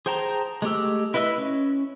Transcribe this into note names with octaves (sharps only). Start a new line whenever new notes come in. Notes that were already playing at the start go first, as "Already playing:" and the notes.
G#4 C5 G5 A5 A#5
G#3 A3 G4 E6
E4 B4 D#5 E5 E6
C#4